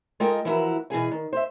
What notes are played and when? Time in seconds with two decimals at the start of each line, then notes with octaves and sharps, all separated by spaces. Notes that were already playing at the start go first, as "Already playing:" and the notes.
0.20 G#3 F4 A4 A#4 D#5 G5
0.45 E3 F3 B3 E4 F#4 A#4
0.90 B2 E3 G#4 G#5
1.11 D#3
1.33 C5 E5